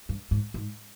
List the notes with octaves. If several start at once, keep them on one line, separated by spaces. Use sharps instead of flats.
G2
G#2
G#2